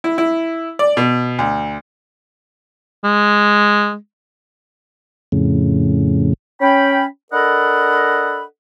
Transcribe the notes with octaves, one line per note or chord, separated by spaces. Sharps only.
E4
E4
D5
B2
D2
G#3
F2 A2 C#3
C#4 G5 B5
D4 A4 A#4 D#5 F#5 B5